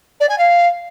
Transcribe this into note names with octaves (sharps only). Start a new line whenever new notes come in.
D5
G#5
F5